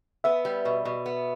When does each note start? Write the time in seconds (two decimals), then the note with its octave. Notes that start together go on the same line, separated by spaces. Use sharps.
0.24 B3 E5
0.45 G3
0.65 B2
0.85 B2
1.06 B3